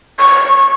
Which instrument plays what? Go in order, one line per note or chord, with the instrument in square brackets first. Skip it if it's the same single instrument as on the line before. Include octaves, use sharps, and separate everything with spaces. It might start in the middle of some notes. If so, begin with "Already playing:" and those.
[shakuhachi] C#6